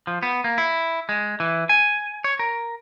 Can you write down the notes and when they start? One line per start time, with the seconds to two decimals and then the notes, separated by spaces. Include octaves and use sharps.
0.07 F3
0.23 B3
0.44 A#3
0.58 E4
1.09 G#3
1.40 E3
1.69 G#5
2.24 C#5
2.39 A#4